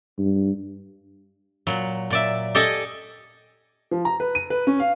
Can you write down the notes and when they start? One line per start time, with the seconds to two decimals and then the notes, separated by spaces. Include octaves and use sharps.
0.18 G2
1.67 A#2 F#3
2.10 A#2 D5 E5
2.55 G4 A4 D5 D#5 G#5
3.91 F3
4.05 A#5
4.20 B4
4.35 D#7
4.50 B4
4.67 C#4
4.80 F5